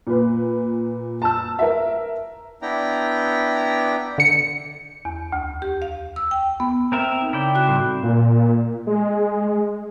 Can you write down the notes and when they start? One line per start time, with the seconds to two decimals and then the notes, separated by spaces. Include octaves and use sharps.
0.07 A#2 B4
1.22 A5 E6
1.59 A#4 E5
2.62 B3 D4 E4 G5 A#5
4.18 D3 C#7
5.05 E2
5.33 D2
5.62 G4
5.82 F5
6.16 E6
6.31 G5
6.60 B3
6.92 C4 A#4 E5
7.21 D#4
7.33 C#3 E4 D5 G5
7.54 C4 F#4 F#6
7.66 A2 G3 C4
8.03 A#2
8.87 G#3